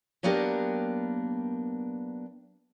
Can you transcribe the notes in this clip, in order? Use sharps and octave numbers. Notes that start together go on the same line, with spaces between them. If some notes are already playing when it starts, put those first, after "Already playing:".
F#3 A#3 B3 D4 G4 A#4